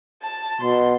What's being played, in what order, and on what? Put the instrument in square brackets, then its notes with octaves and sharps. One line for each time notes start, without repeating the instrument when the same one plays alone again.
[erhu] A5
[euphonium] B2 [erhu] C6